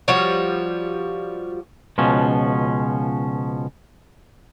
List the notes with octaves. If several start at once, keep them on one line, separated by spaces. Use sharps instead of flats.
F3 G3 F#4 C#5
C#2 B2 F3 C#4